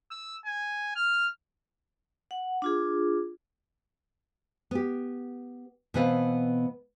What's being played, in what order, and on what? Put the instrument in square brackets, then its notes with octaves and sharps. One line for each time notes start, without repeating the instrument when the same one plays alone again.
[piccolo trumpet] E6
G#5
F6
[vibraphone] F#5
D4 F4 G#4
[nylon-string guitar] B3 G4
B2 E3 B3 C4 B4 F5